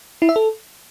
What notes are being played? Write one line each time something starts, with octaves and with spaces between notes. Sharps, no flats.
E4
E5
A4